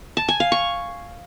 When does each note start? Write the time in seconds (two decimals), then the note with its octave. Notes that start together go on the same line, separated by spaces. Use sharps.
0.17 A5
0.28 G#5
0.40 F5
0.52 C#6